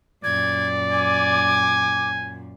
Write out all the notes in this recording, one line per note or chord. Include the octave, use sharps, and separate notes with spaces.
F#2 A#2 D5 G#6
G#5 D6